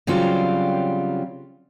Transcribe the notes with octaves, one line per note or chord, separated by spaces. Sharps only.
C#3 F#3 G3 C4 F4